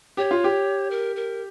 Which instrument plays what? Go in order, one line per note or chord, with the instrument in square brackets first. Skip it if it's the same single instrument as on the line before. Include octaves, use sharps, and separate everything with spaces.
[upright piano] G4 [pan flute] C#5
[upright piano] F4
G4
[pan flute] A#4
A#4